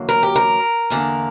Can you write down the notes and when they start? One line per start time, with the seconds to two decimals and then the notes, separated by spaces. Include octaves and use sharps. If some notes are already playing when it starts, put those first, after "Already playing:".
Already playing: E2 D3 F#3 A#3
0.09 A#4
0.23 G4
0.36 A#4
0.90 E2 D3 A#3